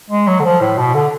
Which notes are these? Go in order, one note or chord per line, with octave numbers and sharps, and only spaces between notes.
G#3
F#3
D3
F3
A2
B2
D3